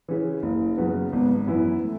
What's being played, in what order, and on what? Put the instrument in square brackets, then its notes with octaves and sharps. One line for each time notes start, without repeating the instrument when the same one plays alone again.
[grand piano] C#3 E3
F#1
F#2 C#3 F#3 B3
[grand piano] G#1 [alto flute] B3
[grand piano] F#2 E3 B3 E4
[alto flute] A3